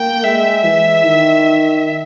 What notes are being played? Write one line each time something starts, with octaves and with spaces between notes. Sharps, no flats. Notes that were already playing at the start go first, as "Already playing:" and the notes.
Already playing: A#3 G5
G#3 E5
E3
D#3